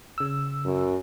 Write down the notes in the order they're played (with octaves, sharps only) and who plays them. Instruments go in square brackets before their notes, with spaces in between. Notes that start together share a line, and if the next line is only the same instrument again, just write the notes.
[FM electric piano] C#3 E6
[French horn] F#2